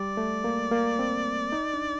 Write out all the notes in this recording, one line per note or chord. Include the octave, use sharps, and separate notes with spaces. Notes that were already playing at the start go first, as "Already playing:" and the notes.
Already playing: G3 D5
A3
A#3
A#3
C4
D#4
D4